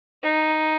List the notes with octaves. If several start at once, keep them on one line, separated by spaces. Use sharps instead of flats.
D#4